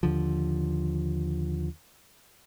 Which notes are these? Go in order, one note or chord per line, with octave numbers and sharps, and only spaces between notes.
D#2 D3 F3